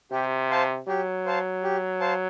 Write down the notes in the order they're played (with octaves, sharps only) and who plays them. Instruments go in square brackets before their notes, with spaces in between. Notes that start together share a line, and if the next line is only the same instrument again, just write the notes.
[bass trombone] C3 [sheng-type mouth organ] G4
[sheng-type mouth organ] C5 F5 A5
[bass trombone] F#3 [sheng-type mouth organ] G4
[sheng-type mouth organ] C5 F5 A5
G4
C5 F5 A5